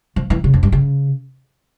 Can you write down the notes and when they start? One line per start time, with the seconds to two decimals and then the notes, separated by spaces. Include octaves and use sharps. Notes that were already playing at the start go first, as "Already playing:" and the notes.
0.16 F3
0.30 E3
0.44 C#3
0.54 F2
0.63 G2
0.72 C#3